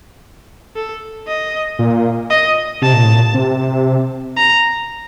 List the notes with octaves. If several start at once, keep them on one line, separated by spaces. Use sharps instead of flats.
A4
D#5
A#2
D#5
C3 A5
A#2
A2
A#2
C3
A#5